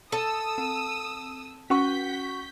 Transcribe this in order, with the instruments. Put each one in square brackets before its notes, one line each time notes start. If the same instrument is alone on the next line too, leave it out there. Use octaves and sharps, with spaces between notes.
[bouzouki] A4 A5 [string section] D#6 E6
[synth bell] C4
[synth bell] C#4 [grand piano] F#4 F#5 C#6 [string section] G6 B6